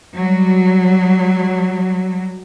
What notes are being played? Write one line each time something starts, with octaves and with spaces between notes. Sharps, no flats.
F#3 G3